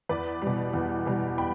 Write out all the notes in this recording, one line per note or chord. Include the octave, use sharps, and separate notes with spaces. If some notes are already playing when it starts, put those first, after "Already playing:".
E2 B4 D5
B2 G3
E2
B2 G3
G5 B5